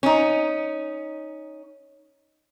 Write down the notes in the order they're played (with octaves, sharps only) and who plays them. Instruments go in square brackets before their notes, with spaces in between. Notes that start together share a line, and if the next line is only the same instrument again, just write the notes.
[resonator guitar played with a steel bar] C#4 D#4